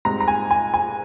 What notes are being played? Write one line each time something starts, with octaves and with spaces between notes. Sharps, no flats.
G#2 G3 C4 A#5
A#5
G#5
G#5
G#5